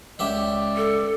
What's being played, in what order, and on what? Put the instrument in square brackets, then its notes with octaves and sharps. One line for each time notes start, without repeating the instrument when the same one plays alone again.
[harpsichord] C#2 G4 E5 [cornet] D5
[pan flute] A4